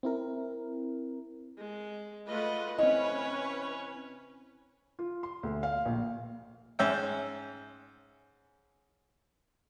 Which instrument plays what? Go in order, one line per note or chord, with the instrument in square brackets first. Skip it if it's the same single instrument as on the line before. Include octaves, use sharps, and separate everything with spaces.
[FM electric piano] C4 E4 A#4
[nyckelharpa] G#3
[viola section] A3 F4 B4 [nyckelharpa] D#5 F#5
[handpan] C4 E4 [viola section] C#4 B4 [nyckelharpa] C#5 [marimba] D#5
[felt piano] F4
C6
D2
F5
A#1
[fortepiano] G#2 C#4 E5 G5